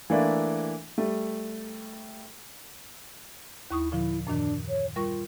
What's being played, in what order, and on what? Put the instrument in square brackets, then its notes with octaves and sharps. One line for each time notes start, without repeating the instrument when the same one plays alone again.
[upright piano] E3 A3 A#3 D4 E4
G3 A3
[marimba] D#2 C#6 D#6 [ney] E4
[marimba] A#2 D3 F3 [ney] E4
[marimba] F#2 A#2 D#3 [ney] D4
[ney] C#5
[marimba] G3 A#4 C#6 [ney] F4